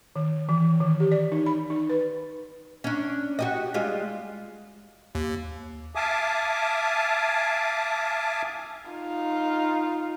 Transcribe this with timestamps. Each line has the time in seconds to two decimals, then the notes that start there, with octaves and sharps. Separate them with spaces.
0.16 D#3
0.49 E3
0.80 D#3
1.00 G4
1.12 D5
1.32 D#4
1.46 B5
1.70 D#4
1.90 B4
2.84 C#4 D4
3.39 F#4 G4 D#5
3.74 G3 G#3 F4
5.15 D#2
5.95 E5 F5 G#5 A5 D6 D#6
8.90 D#4 F4